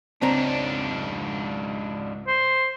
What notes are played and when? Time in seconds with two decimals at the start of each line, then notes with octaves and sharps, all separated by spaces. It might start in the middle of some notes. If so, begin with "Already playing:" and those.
0.22 C#2 G#2 C4 D4 A#5
2.27 C5